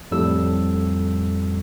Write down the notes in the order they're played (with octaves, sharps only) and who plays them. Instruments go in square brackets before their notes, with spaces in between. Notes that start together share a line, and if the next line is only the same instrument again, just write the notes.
[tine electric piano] F2 A2 G3 A4 E6